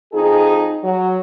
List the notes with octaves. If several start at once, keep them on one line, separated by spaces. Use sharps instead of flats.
F2 D#4 G#4
F#3